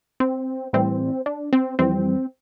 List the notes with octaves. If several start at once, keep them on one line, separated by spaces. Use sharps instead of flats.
C4
A2 E3 G3 C4
D4
C4
F2 E3 G3 C4